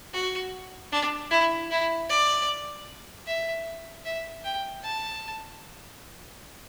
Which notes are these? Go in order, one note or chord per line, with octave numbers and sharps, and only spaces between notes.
F#4
D4
E4
E4
D5
E5
E5
G5
A5